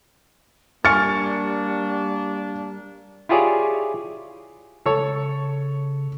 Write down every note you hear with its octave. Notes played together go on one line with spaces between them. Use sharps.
G3 A#3 D4 G#5 C#6 F6 A6 C#7
E4 F4 G4 G#4 C#5 D5
C#3 A4 C#5